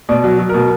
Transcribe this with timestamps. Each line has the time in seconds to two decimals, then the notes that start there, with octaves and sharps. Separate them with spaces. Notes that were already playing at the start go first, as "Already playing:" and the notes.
0.09 B2 D5
0.24 F#3
0.39 F#3
0.49 B2 A#4